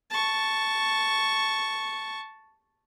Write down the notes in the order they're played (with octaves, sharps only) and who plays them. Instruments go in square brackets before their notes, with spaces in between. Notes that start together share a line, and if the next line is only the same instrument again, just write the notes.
[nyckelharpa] A5 C#6